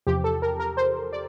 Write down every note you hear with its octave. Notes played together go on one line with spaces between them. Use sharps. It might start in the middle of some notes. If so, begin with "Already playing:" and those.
E2 C3 F3 G4
A4
A#4
A#4
C5
D5